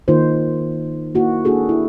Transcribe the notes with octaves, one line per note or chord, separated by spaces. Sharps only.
D#3 A#3 D#4 F4 C5
A#3 E4 F#4
A#3 D4 F#4 G#4 A4
E4